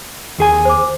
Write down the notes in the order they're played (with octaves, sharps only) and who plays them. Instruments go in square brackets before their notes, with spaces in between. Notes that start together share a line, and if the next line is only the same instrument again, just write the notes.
[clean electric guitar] D#2 G#4 G#5
[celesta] C5 D6